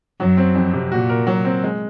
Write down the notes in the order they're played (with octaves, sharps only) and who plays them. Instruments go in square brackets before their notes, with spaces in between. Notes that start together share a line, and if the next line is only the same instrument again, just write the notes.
[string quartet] F#2 [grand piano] F#3
[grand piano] C4
F2
C3
[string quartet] A#2 [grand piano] F#4
[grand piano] A#4
F#3
C4
G#3